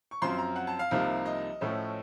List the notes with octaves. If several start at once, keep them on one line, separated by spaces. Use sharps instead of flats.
C#6
F#2 F3 C4 F4 C6
A#5
F#5
A5
F5
C2 C3 F3 A#3 D#4
D#5
A2 F3 A3 C#4